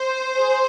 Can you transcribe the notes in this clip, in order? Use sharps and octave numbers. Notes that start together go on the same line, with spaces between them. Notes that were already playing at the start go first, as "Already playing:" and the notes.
Already playing: C5
G#4